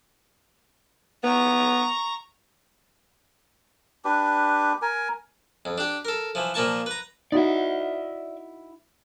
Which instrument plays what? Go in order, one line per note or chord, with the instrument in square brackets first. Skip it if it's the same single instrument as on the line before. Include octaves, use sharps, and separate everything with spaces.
[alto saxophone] B3 [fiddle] A#5 C#6
[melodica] D4 G4 B4
A#4 G#5
[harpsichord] F2
D4 G4
A4 A#4
E3 F3
A#2 F3 A#3 A5 C#6
B4 A#5
[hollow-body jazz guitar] D#4 E4 F#4 [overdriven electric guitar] D5 E5